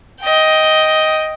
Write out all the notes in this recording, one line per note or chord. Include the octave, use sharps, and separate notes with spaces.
D#5 G5